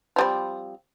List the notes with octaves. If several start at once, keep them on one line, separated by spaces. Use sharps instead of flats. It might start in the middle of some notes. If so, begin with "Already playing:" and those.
F3 G3 C4